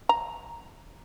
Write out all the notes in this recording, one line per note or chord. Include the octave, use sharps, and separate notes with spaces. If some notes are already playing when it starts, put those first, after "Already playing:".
A#5